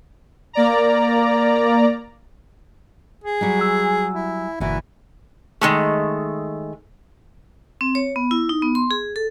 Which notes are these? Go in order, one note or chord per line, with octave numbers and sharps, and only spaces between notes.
A#3 D5 A#5
G#4
F#3 G3 F#4
G#5 E6
E4
G1 A#2 E3 E4 F#4
D#3 G#3 A3
C4
C#5
B3
E4
D#4
B3
C6
G#4
A4